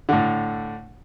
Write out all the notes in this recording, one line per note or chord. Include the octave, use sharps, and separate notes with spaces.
A2 D3